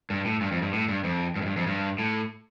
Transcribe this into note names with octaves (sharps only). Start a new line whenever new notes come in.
G2
A2
G2
F2
G2
A2
G2
F2
G2
F2
G2
F2
G2
A2